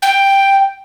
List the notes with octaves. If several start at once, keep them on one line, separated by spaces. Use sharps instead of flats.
G5